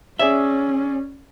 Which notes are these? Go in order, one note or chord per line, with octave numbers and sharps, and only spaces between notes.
C#4 G#4 C#5 D5 E5